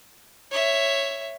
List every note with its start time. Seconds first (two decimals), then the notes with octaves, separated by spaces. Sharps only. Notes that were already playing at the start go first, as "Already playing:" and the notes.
0.51 C#5 E5